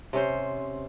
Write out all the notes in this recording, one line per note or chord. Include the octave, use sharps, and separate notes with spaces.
C3 C#4 C5